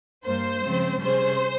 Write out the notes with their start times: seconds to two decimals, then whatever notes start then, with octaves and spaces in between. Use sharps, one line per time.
0.24 G2 G3 A#3 C5
0.62 C#3 F3 G#3 C4
1.01 C3 G3 C#4 G#4 C5